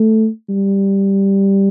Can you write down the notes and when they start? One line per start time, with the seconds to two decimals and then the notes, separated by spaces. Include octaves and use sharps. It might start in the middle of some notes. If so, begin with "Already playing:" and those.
Already playing: A3
0.49 G3